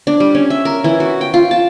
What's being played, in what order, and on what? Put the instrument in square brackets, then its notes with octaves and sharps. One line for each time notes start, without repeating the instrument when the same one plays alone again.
[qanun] D4
G3
C#4
E5
A#4
E3
F#4
G5
F4
A5